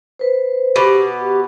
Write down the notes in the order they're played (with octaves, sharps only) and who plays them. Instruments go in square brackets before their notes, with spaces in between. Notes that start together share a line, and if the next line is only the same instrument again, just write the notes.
[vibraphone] B4 C5
[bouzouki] B2 [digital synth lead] G4